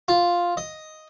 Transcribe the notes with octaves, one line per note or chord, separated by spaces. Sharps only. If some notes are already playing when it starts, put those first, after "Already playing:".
F4
D#5